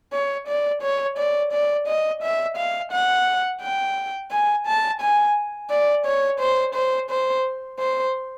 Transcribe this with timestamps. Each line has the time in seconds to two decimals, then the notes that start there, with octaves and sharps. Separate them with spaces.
0.13 C#5
0.47 D5
0.82 C#5
1.18 D5
1.52 D5
1.87 D#5
2.22 E5
2.57 F5
2.92 F#5
3.61 G5
4.31 G#5
4.67 A5
5.01 G#5
5.71 D5
6.06 C#5
6.40 C5
6.75 C5
7.10 C5
7.79 C5